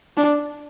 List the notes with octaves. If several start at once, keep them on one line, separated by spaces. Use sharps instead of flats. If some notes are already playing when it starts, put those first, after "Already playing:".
D4